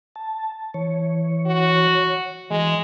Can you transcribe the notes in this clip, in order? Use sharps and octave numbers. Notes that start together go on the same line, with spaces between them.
A5
E3 C#5
F#4
E3 G#3